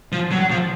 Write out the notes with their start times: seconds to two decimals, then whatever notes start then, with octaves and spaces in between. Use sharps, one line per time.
0.12 F3
0.32 F#3
0.50 F3